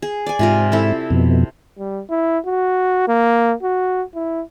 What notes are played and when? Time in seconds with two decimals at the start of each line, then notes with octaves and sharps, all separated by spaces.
0.02 G#4
0.26 D5 G#5
0.39 G#2 C3 F4 A#4
0.72 C4 E4 A4
1.10 F2 B2
1.79 G3
2.10 E4
2.46 F#4
3.08 A#3
3.63 F#4
4.15 E4